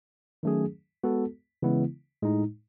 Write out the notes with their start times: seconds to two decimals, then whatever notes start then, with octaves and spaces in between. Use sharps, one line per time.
0.43 D#3 F#3 A3 C#4 G#4
1.04 G#3 B3 F#4 A4
1.62 C#3 E3 G#3 B3 E4
2.22 A2 G#3 D#4